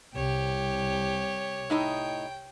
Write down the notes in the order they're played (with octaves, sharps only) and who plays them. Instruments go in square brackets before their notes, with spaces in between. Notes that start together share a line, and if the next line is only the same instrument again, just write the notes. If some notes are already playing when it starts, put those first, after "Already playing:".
[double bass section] C2 [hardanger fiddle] G4 [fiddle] C#5
[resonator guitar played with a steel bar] A2 D#4 D#5 [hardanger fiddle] G5